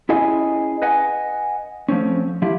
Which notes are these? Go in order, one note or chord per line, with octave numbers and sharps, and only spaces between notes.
C#4 E4 G#4 D#5 G#5
B4 D#5 F#5 G#5
F3 A3 C4 C#4
F3 E4 G4